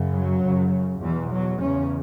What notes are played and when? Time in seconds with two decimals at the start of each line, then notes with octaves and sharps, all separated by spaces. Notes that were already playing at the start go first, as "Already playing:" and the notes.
Already playing: F#2 C#3
0.14 F#3
0.43 F#2 C#3
1.02 E2 B2 E3
1.32 F#3
1.61 E2 C#3 C#4